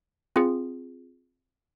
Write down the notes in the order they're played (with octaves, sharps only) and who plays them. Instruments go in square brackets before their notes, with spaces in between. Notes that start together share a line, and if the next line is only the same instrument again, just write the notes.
[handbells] C4 F4 G#4